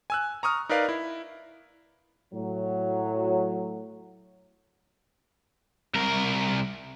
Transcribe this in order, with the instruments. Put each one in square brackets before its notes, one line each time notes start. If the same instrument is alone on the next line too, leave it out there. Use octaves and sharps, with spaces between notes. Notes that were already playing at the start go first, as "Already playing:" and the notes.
[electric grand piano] G#5 E6 F#6
A#5 C#6 D#6 F6
D#4 A#4 B4 D5 F5
E4
[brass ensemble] A2 F#3
[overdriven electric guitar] C2 A#4